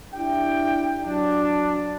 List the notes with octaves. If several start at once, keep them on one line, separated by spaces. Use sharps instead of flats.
D4 E4 G4 G5
F#3 D4